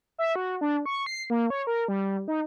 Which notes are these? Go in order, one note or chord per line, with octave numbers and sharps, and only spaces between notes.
E5
F#4
D4
C#6
C7
A#3
C#5
A#4
G3
D#4